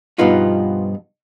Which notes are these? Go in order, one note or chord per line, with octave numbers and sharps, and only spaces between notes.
G2 B2 F3 B3 D#4 F4